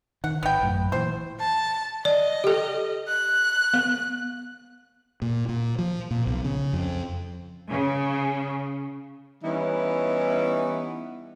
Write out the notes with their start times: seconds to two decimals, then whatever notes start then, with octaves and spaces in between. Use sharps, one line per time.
0.24 D#3 F#5
0.43 G#1 B3 G5
0.61 A1 F#2 A2
0.92 A#2 E3 C5
1.40 A5
2.05 D5 D#5
2.44 G4 A4
3.08 F#6
3.74 B3
5.22 A#2
5.49 A#2
5.79 F3
6.11 A#2
6.26 B1
6.44 C#3
6.73 F2
7.69 C#3
9.44 E3 G3 B3 C#4 D#4 E4